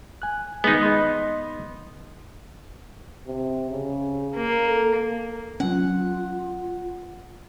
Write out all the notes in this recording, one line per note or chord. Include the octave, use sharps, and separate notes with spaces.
G#5 F#6
D#3 G#3 B3 D#4
D#5 B5 C6
C3
C#3
A#3
A4
F#3 C#4 F4 F#5